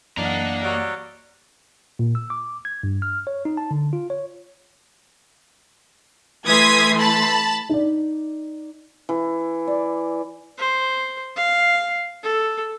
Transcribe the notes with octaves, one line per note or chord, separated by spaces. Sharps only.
F#2 E3 A#3 D4 D#5 F#5 A#5 F#6
F#3 G3
A#2
E6
D6
G#6
G2
F6
C#5
D#4
A5
D3
F4
C#5
E3 A3 C6 D#6 G#6 B6
A5 B5
D#4 D5
E3
D5
C5
F5
A4